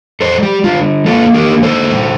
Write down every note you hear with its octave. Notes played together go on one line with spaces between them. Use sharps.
G3 A4 C5
G4
D3 F4
A#3 F4 A4
G4 A#4
D3
A4 C5
G3